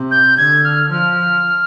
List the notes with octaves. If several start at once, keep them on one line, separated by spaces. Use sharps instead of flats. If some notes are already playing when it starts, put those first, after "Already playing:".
Already playing: C3
G6
D3 G#6
F6
F3 F6